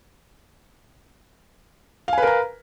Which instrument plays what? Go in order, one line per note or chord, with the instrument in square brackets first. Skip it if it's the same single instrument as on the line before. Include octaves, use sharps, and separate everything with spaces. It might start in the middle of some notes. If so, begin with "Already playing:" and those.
[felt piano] F5
G#5
B4
A#4
A#5